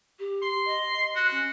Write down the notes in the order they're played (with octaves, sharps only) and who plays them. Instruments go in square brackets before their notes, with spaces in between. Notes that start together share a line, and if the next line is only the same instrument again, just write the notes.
[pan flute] G4
[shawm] C6
[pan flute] D#5
[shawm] F#4 [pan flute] F#6
[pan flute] C#4